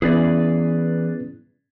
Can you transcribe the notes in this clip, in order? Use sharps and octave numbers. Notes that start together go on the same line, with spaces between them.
E3 B3 C#4 E4 G#4 B4 D5